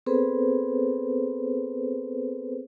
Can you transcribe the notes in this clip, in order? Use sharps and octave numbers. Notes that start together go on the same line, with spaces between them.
B3 C4 G#4 A4 B4 C5